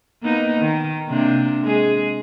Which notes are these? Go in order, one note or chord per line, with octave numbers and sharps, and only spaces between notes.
A#3 B3 D#4
D#3
C3 A#3 D4
G#3 G#4